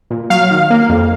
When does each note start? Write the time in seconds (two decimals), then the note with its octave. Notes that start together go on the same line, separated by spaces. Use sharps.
0.10 A#2
0.30 F#3 F5
0.51 D#3
0.70 A#3
0.89 F2